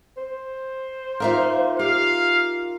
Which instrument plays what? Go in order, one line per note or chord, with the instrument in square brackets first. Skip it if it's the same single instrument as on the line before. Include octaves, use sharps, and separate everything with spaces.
[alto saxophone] C5
[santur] A#3 D#4 F4 [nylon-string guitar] A#4 E5 F5
[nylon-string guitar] G4 [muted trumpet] F5